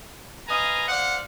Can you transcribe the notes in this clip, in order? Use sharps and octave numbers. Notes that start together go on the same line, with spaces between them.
B4 D#5 F5 G#5 A#5
C5 D5 F5 F#5